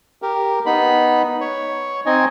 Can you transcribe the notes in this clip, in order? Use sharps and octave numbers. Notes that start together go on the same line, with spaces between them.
G4 A#4
B3 D#4 B5
C#5
C4 D#4 D#5 G#5